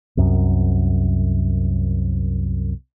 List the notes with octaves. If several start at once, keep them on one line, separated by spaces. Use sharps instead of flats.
C2 F#2